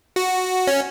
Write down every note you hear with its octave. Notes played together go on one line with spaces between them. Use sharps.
F#4
C#4